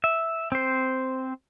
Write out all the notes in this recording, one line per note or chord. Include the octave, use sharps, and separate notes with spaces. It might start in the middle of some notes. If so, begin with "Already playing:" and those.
E5
C4 C5